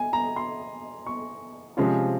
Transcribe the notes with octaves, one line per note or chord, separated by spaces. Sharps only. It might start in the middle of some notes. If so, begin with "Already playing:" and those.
Already playing: G#5
A#5
C6
C#6
C3 F3 G#3 C#4 F4